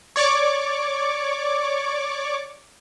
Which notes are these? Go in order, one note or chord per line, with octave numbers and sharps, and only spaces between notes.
C#5 D5 C#6 D6